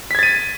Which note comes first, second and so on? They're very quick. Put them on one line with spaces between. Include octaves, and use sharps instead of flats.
B6 G#6 A6 D#7